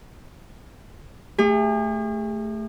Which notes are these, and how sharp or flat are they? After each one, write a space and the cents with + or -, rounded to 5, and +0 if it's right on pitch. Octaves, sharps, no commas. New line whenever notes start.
A3 +0 G#4 -45